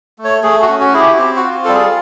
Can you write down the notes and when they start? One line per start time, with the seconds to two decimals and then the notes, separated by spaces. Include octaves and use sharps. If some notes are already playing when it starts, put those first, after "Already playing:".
0.18 A3
0.24 C#5
0.43 A3 G#4
0.62 F#4
0.68 C#4
0.81 F#4
0.93 E4 G#4
0.99 G4
1.13 F#4
1.18 C4 G4
1.36 F#4
1.43 F4
1.65 G3 A4
1.74 G#4